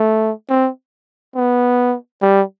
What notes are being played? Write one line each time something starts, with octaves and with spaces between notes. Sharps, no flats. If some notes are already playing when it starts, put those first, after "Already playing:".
Already playing: A3
C4
B3
G3